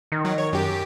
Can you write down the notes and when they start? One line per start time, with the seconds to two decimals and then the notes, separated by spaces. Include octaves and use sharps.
0.12 D#3
0.25 F#3
0.38 C#5
0.53 F#2 G4